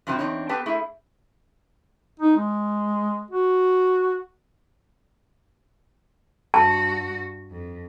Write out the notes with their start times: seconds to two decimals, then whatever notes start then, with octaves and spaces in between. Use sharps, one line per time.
0.07 G2 C3 F3 F#3 C4
0.19 E2 C4 D4 D#4 C#5
0.49 B3 G4 A4 B4 G5 A5
0.66 A3 E4 G#4
2.19 D#4
2.37 G#3
3.31 F#4
6.54 G2 F#4 A5
7.51 F2